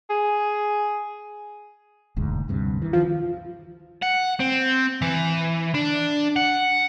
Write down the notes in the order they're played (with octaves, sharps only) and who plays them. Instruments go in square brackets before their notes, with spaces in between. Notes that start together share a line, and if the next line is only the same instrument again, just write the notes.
[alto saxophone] G#4
[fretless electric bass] E1 D2 G#2
D2 G2 C3
D#3 E3
[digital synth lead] F3
[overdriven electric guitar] F#5
C4
E3
D4
F#5